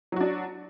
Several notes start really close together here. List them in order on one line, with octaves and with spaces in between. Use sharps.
F#3 F#4 D4